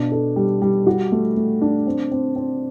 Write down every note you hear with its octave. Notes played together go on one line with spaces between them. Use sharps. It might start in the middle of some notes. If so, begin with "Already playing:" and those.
Already playing: B2 D4
A4
G3
G3
F#4
A3
A3
D4
C4
C4
C4